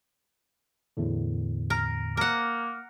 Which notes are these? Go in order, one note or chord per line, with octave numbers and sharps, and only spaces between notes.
E2 A2 D3
A#4
A#3 A#4 F#5